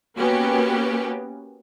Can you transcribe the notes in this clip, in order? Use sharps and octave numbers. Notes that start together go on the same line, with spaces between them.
A#3 B3 C#4 F#4 G4 B4